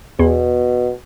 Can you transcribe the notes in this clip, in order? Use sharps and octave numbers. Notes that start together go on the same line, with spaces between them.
E2 B2